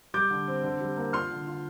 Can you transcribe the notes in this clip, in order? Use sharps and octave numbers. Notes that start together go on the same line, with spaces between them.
G3 D6 G6
D3
C4
D3
G3
A#3
F4 C6 F6
D3
F4